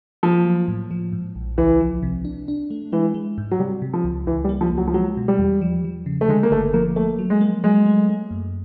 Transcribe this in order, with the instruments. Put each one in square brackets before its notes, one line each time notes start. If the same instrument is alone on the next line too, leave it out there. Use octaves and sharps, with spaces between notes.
[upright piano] F3 [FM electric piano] A#3
[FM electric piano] F#3
A2
F3
G#2
A#1
[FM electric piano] C#2 [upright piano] E3
[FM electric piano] F3
C3
D4
D4
A3
[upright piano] E3 [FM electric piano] G#3
[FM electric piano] G#3
G#2
[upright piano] F#3
[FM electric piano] C3 [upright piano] G3
[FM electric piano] C3
[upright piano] F3
[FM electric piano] C#2
[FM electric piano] C#2 [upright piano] E3
[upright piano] G3
[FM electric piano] A#3
[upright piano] F3
[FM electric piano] C#2
[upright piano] F#3
F3
[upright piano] F#3 [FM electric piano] G#3
[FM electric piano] B2
[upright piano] G3
[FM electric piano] E2
F3
F3
C#3
[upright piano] A3
[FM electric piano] D3 [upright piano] G#3
[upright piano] A#3
[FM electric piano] G1 [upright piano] A3
[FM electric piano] F3 [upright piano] A#3
[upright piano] A3 [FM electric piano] A#3
[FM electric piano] F#3
[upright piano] G#3
[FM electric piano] A#3
[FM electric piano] F#3 [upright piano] G#3
[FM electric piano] A3
A3
F#2